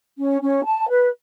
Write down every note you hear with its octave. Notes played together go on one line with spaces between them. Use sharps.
C#4
C#4
A5
B4